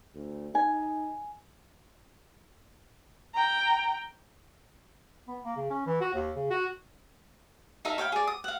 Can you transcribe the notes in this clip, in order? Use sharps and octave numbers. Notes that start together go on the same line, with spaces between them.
D2
D#4 G#5
G5 A#5
B3
A#3
C#3
C#4
E3
F#4
D#2
C#3
F#4
D#4 A4 E5 F5
C#5 F5 G5 B5
G#4 D5
D#6
F5 F#5